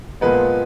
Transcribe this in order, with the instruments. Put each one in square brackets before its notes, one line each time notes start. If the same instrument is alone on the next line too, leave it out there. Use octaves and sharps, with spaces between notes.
[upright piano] A#2 F3 G#3 B3 B4